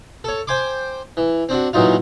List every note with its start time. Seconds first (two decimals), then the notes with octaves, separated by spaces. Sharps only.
0.24 A4 C#5
0.47 C5 G5 G#5 C6 D6
1.17 E3
1.49 C4 D4 F#4
1.73 A#2 E3 F#3 D#4 F4